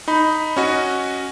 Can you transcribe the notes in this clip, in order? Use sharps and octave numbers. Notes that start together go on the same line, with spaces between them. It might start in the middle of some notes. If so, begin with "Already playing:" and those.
D#4 B5
C#4 F#4 D#5